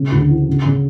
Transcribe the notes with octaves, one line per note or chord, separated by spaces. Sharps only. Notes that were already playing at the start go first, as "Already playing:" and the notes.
Already playing: C#3
D2
E3
C#3
C#3